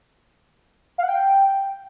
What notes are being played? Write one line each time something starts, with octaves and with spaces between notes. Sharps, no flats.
F5
F#5
G5